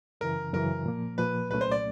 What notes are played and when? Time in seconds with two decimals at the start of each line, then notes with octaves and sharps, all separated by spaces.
0.21 F#2 C#3 E3 A#4
0.53 F#2 C#3 E3 A#4
0.86 A#2 F3 A#3
1.18 A#2 F3 A#3 B4
1.50 C2 A#2 F#3 A3 C#4 B4
1.61 C5
1.71 D5